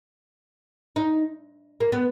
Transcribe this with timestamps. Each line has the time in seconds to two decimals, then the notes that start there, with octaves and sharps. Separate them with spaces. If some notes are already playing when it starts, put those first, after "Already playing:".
0.96 D#4
1.80 A#3
1.92 B3